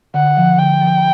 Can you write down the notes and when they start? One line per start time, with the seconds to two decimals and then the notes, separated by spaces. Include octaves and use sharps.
0.14 D3 F#5
0.37 F3
0.59 D3 G5
0.81 F3